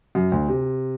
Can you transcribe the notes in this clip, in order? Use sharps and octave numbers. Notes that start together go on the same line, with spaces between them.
F#2
D2
C3